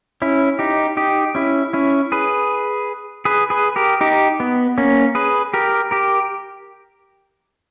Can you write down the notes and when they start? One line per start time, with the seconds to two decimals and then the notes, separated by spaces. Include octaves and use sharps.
0.22 C#4 E4
0.59 D#4 G4
0.97 D#4 G4
1.35 C#4 E4
1.73 C#4 E4
2.12 G#4 B4
3.25 G#4 B4
3.50 G#4 B4
3.76 G4 A#4
4.01 D#4 G4
4.40 B3
4.78 A#3 C#4
5.15 G#4 B4
5.54 G4 A#4
5.91 G4 A#4